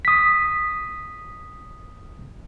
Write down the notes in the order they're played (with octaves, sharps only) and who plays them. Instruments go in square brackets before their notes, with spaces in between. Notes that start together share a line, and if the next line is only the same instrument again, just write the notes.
[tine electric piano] D#6 B6